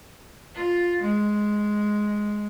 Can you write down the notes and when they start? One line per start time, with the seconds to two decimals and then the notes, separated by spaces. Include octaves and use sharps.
0.54 F4
1.01 G#3